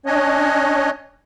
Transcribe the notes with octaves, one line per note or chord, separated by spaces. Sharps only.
C#4 D4 C#5 D#5